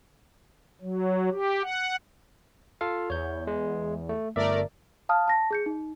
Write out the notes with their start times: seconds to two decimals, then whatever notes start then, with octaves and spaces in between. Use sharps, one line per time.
0.81 F#3
1.32 G4
1.62 F#5
2.81 F4 A4 F5
3.10 E2 C#5 G6
3.47 G#3
4.09 A3
4.36 G1 A3 A#4 D5 E5
5.09 F5 A5 D#6 F6
5.28 A5 A#6
5.51 G#4 G6 C#7
5.66 D#4